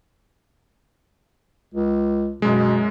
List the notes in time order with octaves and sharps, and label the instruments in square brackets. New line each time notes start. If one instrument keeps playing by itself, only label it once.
[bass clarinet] C#2
[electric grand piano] F#2 G#3 [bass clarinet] B2